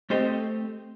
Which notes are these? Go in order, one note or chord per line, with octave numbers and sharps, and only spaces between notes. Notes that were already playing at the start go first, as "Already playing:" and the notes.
A3 C4 G4 C5 D#5